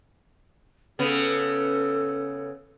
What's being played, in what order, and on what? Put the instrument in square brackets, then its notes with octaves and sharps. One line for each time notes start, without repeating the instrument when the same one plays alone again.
[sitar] C#3 B3 [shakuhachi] A4